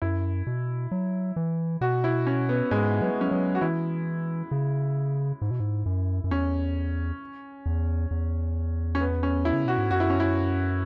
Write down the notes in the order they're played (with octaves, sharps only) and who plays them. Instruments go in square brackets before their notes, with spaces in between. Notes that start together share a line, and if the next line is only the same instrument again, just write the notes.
[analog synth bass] F#2 [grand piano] E4
[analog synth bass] B2
F#3
E3
[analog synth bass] B2 [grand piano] F#4
[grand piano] E4
C#4
B3
[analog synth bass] G#2 [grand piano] G#3
[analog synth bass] F#3 [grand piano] B3
[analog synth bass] G#3
[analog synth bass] F#3 [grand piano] C#4
[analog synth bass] F#3 [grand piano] B3
[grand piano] F#4
[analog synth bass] E3 [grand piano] E4
[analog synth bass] C#3
G#2
B2
G#2
F#2
F#2
[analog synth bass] E2 [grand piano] C#4
[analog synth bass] E2
E2
[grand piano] C#4
B3
C#4
E4
[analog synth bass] C#3
[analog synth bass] B2 [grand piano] F#4
[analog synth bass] G#2
[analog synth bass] F#2 [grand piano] F#4
[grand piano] E4
C#4
E4